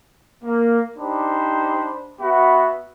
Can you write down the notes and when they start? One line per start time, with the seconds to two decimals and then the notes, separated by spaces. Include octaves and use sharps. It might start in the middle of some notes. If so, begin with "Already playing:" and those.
0.43 A#3
0.96 D4 D#4 G4 C5 B5
2.20 B3 F#4 E5 B5